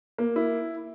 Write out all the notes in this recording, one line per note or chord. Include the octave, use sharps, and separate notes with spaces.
A#3
E4